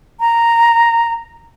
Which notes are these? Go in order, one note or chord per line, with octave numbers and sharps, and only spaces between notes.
A#5